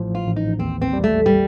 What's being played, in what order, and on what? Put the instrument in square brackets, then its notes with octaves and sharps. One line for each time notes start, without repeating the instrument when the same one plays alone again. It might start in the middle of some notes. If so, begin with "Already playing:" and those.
Already playing: [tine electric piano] A1 A2 F3
[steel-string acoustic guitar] F4
[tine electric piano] A1
[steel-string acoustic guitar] D#4
[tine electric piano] D#2 [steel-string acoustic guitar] C4
[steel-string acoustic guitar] C4
[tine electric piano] G3
[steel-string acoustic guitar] A3
G3